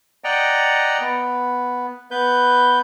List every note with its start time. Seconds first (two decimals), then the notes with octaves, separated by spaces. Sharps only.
0.24 D5 D#5 F#5 G5 A#5
1.01 B3
2.11 B3 B4 G6